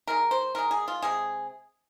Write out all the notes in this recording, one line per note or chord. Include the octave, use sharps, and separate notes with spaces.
D#3 G#3 A#4
C5
D#3 G#3 A#4
G#4
F4
C3 G#3 G#4